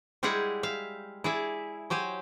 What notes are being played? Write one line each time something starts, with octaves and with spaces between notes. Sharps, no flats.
G3 G#3 E4 G#4 F#5 G5
E5 F5
E4 G#4 D5 E5
F#3 G4 C5 G#5